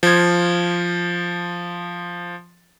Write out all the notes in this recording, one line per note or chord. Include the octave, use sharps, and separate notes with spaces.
F3 G#6